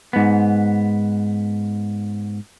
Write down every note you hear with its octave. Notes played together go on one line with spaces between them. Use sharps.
G#2 B3